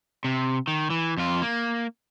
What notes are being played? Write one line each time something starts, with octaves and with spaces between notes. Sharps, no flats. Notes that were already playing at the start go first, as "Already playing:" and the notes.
C3
D#3
E3
F2 F4
A#3